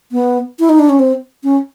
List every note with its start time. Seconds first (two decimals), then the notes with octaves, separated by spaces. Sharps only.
0.12 B3
0.60 E4
0.69 D#4
0.79 D4
0.89 C#4
0.99 C4
1.44 C#4